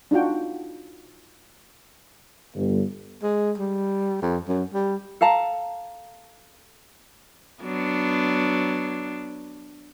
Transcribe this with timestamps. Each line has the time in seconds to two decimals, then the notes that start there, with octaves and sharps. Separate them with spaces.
0.11 D4 D#4 F4 F#4 G5
2.55 G1
3.22 G#3
3.58 G3
4.22 F2
4.48 F#2
4.74 G3
5.21 A4 F5 A5 A#5
7.62 F#3 B3 D4